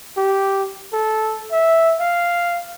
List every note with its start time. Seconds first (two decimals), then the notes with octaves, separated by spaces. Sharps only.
0.17 G4
0.93 A4
1.51 E5
2.00 F5